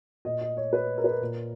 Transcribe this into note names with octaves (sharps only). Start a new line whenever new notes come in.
A#2 D#5
D#5
C#5
B4
A#4
B4
A#4
A#2